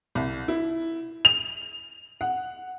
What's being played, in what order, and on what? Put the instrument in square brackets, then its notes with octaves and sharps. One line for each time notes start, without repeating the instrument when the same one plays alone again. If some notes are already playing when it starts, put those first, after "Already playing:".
[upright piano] C2
E4
F7
F#5